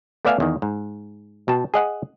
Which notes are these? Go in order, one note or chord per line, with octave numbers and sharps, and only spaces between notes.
A3 B3 D5 E5 F5 G#5
E2 D#3
G#2
B2 G5 A5
G#4 D#5 F#5